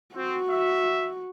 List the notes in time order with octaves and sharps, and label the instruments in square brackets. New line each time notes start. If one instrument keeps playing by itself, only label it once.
[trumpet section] C4 [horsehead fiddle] F#4
[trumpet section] E5